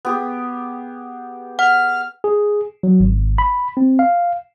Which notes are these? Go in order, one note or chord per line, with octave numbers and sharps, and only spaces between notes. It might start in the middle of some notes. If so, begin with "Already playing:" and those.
B3 G4 G#4
F#5 F6
G#4
F#3
G#1
B5
C4
F5